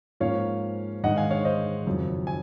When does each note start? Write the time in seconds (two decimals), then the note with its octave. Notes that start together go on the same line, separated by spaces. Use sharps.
0.20 G#2 F3 A#3 C#4 C#5 F5
1.03 G#2 D#3 G#3 D#4 D#5 F#5
1.17 F5 G#5
1.31 C#5 F5
1.45 C5 D#5
1.86 F#1 F2 D#3 F#3
2.27 G#5